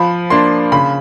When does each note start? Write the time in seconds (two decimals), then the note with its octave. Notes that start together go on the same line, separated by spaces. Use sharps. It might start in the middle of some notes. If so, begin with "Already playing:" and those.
Already playing: F3 B5
0.30 A#3 D4 C6
0.72 C#3 B5